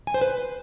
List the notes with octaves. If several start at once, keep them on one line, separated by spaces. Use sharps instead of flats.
G#5
C5
B4